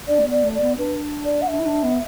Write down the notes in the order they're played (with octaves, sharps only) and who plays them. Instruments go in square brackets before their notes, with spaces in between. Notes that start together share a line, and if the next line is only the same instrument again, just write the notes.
[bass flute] D4 [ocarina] D5
[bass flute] A3
B3
[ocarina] D5
[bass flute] A3
[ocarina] D5
[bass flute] B3
[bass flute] D4 [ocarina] B4
[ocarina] D5
F#5
[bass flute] D4 [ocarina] E5
[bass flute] E4
D4
B3